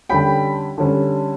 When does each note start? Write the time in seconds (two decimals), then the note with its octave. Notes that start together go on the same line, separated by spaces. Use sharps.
0.09 D3 G3 C#4 G5 B5
0.78 D3 G3 C#4